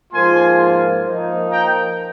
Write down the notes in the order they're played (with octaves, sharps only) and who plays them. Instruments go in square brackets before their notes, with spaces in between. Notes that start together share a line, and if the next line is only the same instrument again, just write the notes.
[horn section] G#2 F3 A#3 F4 G#5 C6
F3 A#3 D#4
G5 A#5